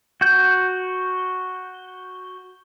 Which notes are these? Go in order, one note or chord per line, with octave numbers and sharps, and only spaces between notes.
F#4 G6